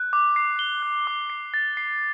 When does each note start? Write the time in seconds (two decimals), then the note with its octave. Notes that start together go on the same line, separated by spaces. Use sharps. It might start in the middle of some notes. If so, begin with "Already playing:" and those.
Already playing: F#6
0.13 D6
0.36 C7
0.59 G7
0.83 F#6
1.07 D6
1.30 C7
1.54 A6
1.77 C7